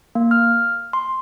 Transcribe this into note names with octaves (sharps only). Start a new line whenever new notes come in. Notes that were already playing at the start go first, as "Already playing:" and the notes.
A#3
F6
C6